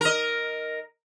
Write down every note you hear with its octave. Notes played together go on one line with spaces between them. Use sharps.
A#4 D#5